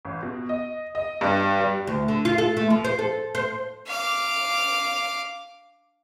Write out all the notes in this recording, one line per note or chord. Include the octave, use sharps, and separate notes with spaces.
A1
B2
D#5
D#5
G2
G3
D2
D3
F4
A4
A3
F3
C5
A4
C5
F5 D6